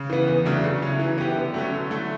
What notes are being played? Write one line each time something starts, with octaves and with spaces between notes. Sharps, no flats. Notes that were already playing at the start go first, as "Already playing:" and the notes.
Already playing: C#3
E3 B3
E2
C#3 F#3 A3 D4
C#3
F#3 C#4 E4
E3
B3 E4 G4
D3
F#3 A3 C#4
D3
F#3 A3 E4 A4